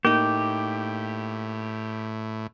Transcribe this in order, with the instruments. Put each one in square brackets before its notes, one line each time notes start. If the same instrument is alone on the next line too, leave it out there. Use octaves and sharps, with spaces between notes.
[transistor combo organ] A2 [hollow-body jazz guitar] A#3 D#4 [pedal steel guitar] G4